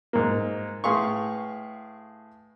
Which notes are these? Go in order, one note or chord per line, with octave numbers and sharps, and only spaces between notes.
G#2 A#3
A2 G#4 B4 F5 C6 C#6